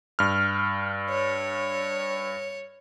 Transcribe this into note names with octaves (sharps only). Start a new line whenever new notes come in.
G2 F6
C#5